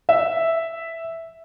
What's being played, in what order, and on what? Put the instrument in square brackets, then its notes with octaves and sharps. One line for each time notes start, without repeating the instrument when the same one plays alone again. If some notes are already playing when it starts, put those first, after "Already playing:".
[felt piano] E5